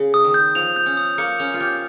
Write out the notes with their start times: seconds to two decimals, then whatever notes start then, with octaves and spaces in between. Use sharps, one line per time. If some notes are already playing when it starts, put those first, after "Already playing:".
Already playing: C#3
0.14 D#6
0.24 D#3
0.34 G6
0.55 F3 F7
0.76 G6
0.86 C#4
0.97 D#6
1.18 A#3 C#7
1.38 C#4 F7
1.54 F4
1.60 G4 G6